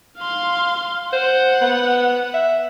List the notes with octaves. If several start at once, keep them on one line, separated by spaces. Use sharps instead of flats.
F5 C6
C5 F#5
B3
E5